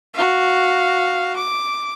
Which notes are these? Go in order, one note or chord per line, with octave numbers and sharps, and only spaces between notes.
F#4 F5
D6